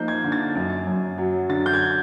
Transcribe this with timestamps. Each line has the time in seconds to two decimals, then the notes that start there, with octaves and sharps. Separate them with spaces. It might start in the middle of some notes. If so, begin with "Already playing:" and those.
Already playing: F3 A#3 D#4 G6
0.08 G#6
0.24 D3
0.32 A6
0.55 F#2
0.87 F#2
1.18 F#3
1.49 D3 A6
1.66 G6
1.74 G#6